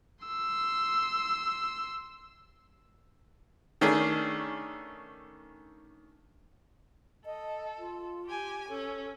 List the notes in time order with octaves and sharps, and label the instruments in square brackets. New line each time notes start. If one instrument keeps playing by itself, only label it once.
[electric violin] C6 E6
[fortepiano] D#3 A3 C#4 D4 G#4
[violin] A4 [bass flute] D#5
[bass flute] F4
[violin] G4 G#5
[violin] C#4 [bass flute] A4